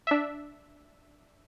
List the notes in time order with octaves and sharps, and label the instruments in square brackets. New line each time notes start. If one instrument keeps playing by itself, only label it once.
[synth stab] D4 E5